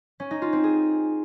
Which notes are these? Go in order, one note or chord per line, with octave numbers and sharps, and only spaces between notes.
C#4
D#4
F4
C4
G#4